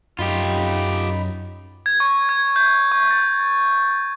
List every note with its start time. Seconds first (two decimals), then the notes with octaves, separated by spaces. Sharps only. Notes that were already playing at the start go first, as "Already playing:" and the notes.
0.19 F#2 D#4 F4 G4 B5
1.86 G#6
2.00 C#6
2.29 G#6
2.56 G6
2.92 C#6
3.11 A6